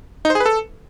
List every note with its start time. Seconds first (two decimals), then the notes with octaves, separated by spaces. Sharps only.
0.25 D#4
0.30 C5
0.35 G#4
0.40 B4
0.46 A4